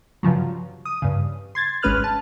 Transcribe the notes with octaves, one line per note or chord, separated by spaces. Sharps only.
G2 C#3 F3 F#3
D#6
G2 C#3
C6 G#6 A6
G#1 G#3 C#4 B4 F6 F#6
A5